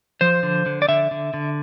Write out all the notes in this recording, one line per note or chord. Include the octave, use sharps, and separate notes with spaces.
F3 C5
D3
D3
D5
D3 E5
D3
D3